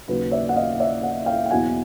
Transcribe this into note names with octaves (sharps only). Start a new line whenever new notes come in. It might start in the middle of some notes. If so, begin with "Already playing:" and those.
D#2 C#3 F#3 B4
D5 E5
F#5
D#5 F5
D5 E5
E5 F#5
F5 G5
G5
E2 B2 F#3 F#5 G#5